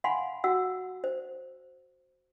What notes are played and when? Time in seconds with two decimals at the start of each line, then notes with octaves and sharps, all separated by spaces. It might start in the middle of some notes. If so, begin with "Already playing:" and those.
0.04 F5 F#5 G#5 B5 C6
0.44 F#4 F#5 E6
1.04 C5